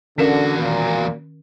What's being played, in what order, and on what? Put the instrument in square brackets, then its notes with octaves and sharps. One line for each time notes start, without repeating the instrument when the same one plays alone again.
[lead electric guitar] E2 F#4 [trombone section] D3 [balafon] C#4 A#4 F5
[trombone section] A#2 [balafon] D#3